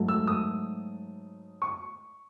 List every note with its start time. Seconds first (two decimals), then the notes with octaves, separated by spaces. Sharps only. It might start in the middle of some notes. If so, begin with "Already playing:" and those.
Already playing: G#2 F#3 A3
0.08 E6
0.27 D#6
1.62 C#6